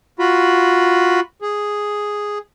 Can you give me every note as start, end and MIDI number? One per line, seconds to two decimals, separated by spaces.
0.19 1.20 65
0.19 1.20 66
0.19 1.20 83
1.42 2.38 68